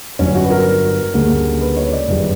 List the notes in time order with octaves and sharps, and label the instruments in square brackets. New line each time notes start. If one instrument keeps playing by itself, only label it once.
[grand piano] G1 G2 F#3 C#4
F#4
B4
A#4
D2 C#3 G3 A#3
B4
C#5
D5
G1 F#2 C#3 G3